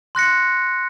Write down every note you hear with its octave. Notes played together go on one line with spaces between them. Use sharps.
C6 F#6 A#6 C#7